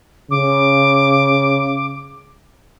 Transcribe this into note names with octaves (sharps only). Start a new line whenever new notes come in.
C#3 D6